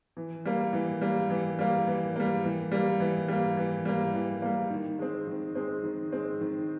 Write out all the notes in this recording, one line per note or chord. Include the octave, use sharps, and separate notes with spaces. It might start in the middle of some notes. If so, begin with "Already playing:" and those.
E3
G3 A#3
E3
G3 A#3
E3
G3 A#3
E3
G3 A#3
E3
G3 A#3
E3
G3 A#3
E3
G3 A#3
E3
G3 A#3
D#3
G#3 C4
D#3
G#3 C4
D#3
G#3 C4
D#3